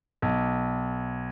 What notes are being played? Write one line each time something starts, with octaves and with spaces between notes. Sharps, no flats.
B1